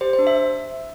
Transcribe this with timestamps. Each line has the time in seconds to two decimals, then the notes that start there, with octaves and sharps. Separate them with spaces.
0.01 G4 C5
0.13 C5
0.19 D4
0.27 E5